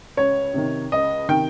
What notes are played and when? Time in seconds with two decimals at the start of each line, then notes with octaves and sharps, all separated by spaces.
0.17 C#2 C#5
0.54 C3 D#3
0.92 C#2 D#5
1.29 C3 D#3 G5